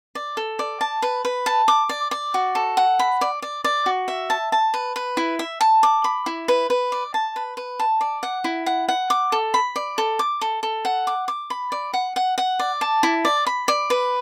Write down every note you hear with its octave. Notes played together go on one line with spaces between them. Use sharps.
D5
A4
D5
A5
B4
B4
A5
D6
D5
D5
F#4
A4
F#5
B5
D5
D5
D5
F#4
E5
A5
A5
B4
B4
E4
E5
A5
D6
B5
E4
B4
B4
D5
A5
B4
B4
A5
D5
F#5
E4
F#5
F#5
D6
A4
B5
D5
A4
D6
A4
A4
F#5
D6
D6
B5
D5
F#5
F#5
F#5
D5
A5
E4
D5
B5
D5
B4